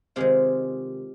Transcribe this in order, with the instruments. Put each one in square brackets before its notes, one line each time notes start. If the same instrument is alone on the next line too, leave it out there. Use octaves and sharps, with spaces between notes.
[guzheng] C3 D#3 G#3 F4 G#4